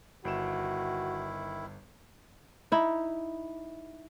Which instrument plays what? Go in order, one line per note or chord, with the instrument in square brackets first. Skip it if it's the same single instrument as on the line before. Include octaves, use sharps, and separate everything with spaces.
[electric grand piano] G1 D7 E7 [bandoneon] D#3 E4 [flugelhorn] F#4
[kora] D#4 E4